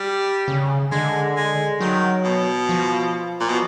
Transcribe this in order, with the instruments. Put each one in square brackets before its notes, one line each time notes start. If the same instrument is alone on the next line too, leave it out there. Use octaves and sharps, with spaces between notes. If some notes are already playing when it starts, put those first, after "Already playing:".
Already playing: [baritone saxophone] G3
[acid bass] C#3
[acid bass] D3 [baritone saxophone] G#3
[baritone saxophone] G#3
[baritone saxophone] D#3 [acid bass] F#3
[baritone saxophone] B2
[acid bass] F3
[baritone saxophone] A#2
B2